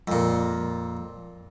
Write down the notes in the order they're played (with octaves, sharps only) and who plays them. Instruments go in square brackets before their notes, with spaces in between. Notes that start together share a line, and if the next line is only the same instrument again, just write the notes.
[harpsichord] F2 A#2